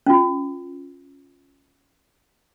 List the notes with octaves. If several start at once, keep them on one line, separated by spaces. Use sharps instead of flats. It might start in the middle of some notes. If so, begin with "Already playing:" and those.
C#4 F4